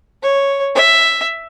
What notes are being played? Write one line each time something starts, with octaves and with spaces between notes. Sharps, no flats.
C#5
E5